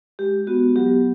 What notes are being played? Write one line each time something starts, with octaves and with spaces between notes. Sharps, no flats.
G#3 G4
B3 F#4
F#3 G4